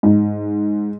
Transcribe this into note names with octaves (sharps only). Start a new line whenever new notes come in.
G#2